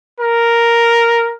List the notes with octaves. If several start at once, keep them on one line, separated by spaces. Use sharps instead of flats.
A#4